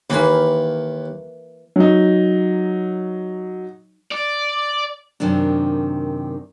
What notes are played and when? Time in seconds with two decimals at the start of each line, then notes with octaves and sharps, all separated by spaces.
0.10 D#2 E3 A#3 B4 C6
1.76 F#3 D#4
4.12 D5
5.20 F#2 C3 D#3 D4